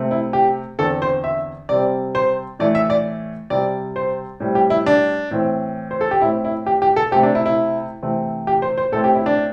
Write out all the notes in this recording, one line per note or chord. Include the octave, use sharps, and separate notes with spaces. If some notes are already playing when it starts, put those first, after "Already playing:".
Already playing: C3 A3 C4
E4
G4
E2 D3 C4 A4
C5
E5
C3 G3 C4 D5
C5
A2 E3 A3 D5
E5
D5
C3 G3 C4 D5
C5
A2 G3 C4
G4
E4
D4
A2 E3 C4
C5
A4
G4
A2 A3 C4 E4
E4
G4
G4
A4
C3 A3 C4 G4
D4
E4
E4
C3 E3 A3 C4
G4
C5
C5
A2 A3 C4 A4
G4
E4
D4